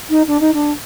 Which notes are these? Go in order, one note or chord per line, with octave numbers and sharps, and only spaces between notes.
D#4
D4
D#4
D4